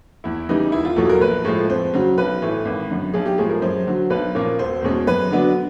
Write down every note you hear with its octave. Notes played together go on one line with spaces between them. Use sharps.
E2 E4
C#3 E3 G3 D#4
E1 E4
F4
E2 B2 F#3 A4
A#4
A#1 B4
A2 F3 G#3
F2 C5
C#3 F#3
B1 B4
A2 E3
G#1
F#2 D3
B1 G#4
G4
A2 F3 G#3 G#4
A#4
F#2 C5
D3 F#3
B1 B4
A#2 F3 A#3 C#4
E1 C5
E2 B2 G#3 C#4
F#2 B4
D3 F#3 B3 D4